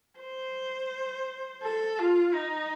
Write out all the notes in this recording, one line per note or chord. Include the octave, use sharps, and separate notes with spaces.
C5
A4
F4
D#4